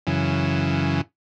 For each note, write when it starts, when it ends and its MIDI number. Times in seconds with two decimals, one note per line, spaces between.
0.07 1.01 42
0.07 1.01 49
0.07 1.01 52